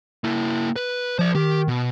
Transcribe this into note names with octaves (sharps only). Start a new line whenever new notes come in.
A#3 E4
B4
F3 C5 D5
D#3 G4
B2